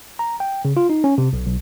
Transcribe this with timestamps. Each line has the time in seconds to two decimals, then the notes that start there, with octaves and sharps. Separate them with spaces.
0.19 A#5
0.40 G5
0.65 C#3
0.77 F4
0.90 D#4
1.04 C#4
1.18 C3
1.33 B1
1.46 B1